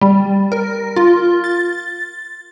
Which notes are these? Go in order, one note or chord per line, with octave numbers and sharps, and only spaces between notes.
G3
A#4
F4
A6